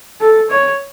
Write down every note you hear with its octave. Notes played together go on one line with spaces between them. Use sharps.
A4
C#5